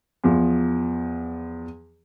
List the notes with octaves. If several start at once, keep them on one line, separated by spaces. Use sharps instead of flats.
E2 F3